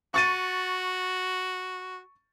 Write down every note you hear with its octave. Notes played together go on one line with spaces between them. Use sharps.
F#4 C#6 A6 D#7